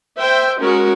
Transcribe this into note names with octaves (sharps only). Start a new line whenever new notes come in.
C5 E5 G5
G#3 C#4 F#4 A#4